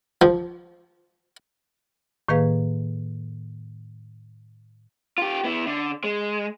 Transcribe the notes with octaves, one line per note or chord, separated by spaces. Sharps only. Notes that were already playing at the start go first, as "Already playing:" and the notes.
F3
A2 D#3 A#3 G#4 B4 F5
F4 G4
B3 E4
D3
G#3